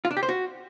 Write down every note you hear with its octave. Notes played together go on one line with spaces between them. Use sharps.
F4
D4
G4
C5
F#4